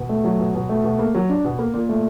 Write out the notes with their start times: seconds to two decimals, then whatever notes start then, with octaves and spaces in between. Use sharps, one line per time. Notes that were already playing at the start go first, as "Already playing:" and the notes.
Already playing: B2
0.09 A3
0.24 F#3
0.39 B2
0.55 B2
0.69 A3
0.84 B2
0.99 A#3
1.15 F#3
1.29 D4
1.44 B2
1.59 A#3
1.74 A#2
1.89 A3